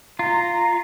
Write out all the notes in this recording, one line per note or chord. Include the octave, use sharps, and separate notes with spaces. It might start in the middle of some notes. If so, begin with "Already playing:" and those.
F4 A#5